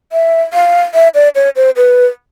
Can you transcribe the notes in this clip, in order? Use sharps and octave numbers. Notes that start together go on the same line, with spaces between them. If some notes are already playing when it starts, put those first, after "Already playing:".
E5
F5
E5
D5
C#5
C5
B4